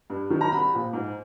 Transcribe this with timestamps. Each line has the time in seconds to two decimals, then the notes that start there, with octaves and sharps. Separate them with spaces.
0.10 G2
0.30 D#3 F#3
0.41 A#5
0.52 C2 B5
0.73 A#2 F3
0.93 G#2